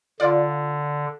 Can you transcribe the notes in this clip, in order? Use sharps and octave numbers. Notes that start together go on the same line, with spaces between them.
D3 F4 D5